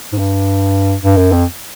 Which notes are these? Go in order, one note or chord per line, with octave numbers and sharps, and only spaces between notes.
G#2
G2
G2
F#2
F2